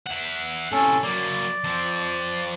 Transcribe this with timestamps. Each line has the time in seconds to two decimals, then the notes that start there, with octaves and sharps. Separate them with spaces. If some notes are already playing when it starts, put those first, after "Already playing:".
0.07 E5 F#5
0.71 A2 C3 C#4 A4
1.03 F#3 A#3 D5
1.64 F3 C4